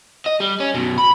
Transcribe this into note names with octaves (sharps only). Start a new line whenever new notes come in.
D#5
G3
C#4
F#2 B2
B5